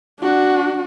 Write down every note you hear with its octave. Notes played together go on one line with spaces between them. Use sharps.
D4 F#4